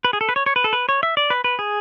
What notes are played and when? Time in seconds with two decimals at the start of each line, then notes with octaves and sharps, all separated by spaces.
0.05 B4
0.13 G#4
0.21 A4
0.29 B4
0.36 C#5
0.46 C#5
0.56 B4
0.64 A4
0.73 B4
0.89 C#5
1.03 E5
1.17 D5
1.30 B4
1.44 B4
1.59 G#4